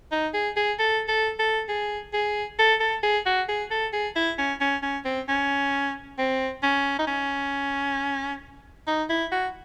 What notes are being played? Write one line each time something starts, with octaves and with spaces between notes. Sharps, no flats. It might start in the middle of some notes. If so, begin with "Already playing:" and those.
D#4
G#4
G#4
A4
A4
A4
G#4
G#4
A4
A4
G#4
F#4
G#4
A4
G#4
E4
C#4
C#4
C#4
C4
C#4
C4
C#4
D#4
C#4
D#4
E4
F#4